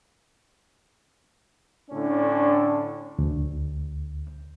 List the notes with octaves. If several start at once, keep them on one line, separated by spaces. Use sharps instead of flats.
A2 D3 C#4 D4
D2